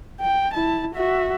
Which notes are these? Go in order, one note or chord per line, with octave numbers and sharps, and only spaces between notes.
G5
E4 A5
F#4 E5